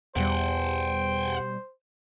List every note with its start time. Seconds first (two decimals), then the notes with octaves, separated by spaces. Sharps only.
0.16 E2 B2 G3 C5 F#5 G5